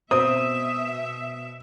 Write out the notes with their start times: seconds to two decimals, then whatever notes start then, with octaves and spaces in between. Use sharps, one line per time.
0.11 B2 C4 E5 D#6